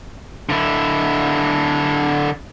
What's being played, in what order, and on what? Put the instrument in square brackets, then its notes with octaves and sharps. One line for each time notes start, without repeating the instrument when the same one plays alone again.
[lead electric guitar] D3 E4